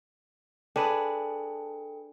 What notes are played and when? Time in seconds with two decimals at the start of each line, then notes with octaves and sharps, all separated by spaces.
0.76 D4 G#4 A4 B4 G5